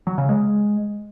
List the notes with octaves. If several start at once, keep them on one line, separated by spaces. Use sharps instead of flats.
F#3
C#3
G#3